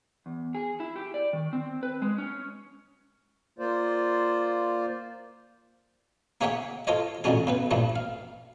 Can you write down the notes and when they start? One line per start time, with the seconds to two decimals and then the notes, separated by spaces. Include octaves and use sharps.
0.26 E2
0.55 G#4
0.80 E4
0.95 G4
1.14 D5
1.33 D#3
1.53 C4
1.83 B4
2.02 G#3
2.18 C#4
3.59 A#3 F4 C5 D5
6.41 A#3 G#4 C#5 E5 F#5 G5
6.87 F4 A4 C5 C#5 D#5
7.24 A1 F2 D3 F#3 C#4 G#4
7.47 C#3 B3 B4
7.71 A#1 G2 F3 G3 A3
7.96 F5